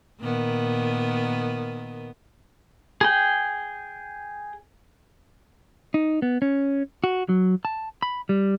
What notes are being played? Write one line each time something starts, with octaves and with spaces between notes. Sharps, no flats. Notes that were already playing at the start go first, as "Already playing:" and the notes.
A#2 D#3 B3
G#4 G5
D#4
B3
C#4
F#4
F#3
A5
B5
G3